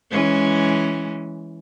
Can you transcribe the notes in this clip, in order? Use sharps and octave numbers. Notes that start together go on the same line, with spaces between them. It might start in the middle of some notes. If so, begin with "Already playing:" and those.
E3 G#3 C#4